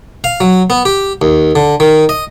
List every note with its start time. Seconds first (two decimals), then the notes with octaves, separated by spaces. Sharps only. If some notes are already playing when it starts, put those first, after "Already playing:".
0.24 F5
0.40 F#3
0.70 B3
0.85 G4
1.22 D#2
1.55 D3
1.80 D#3
2.09 D#5